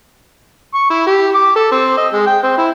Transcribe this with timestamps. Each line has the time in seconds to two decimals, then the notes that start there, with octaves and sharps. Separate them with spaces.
0.74 C#6
0.90 E4
1.06 G4
1.34 D6
1.55 A4
1.71 C4
1.97 D#5
2.13 G#3
2.27 G5
2.43 C4
2.57 E4